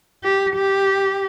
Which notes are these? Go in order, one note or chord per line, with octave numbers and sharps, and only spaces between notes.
G4
G4